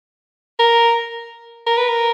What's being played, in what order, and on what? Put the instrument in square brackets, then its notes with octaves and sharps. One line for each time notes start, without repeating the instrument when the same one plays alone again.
[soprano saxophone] A#4
A#4
B4
A#4